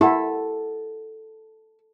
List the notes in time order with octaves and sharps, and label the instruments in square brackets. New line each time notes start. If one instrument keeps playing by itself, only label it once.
[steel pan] E4 [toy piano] G4 A#4 F#5 [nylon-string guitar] A4